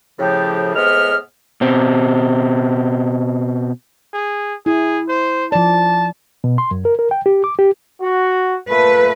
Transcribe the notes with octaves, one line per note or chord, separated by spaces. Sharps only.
A2 C#3 F3 G4
A2 C3 G#3 B3 B4 F6
B2 C4
G#4
E4 G#4
C5
F3 D5 A5
B2
C6
F#2
A#4
A#4
G5
G4
D6
G4
F#4
A#2 A3 B4